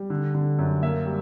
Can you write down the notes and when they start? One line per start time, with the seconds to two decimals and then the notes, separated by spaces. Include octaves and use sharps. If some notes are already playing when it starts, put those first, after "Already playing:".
Already playing: G3
0.10 D3
0.35 D3
0.59 F#2
0.82 A#3 E5
1.06 G3